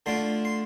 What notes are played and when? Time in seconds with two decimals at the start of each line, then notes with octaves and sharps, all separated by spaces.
0.06 D3 A3 D4 F4 C6
0.45 C6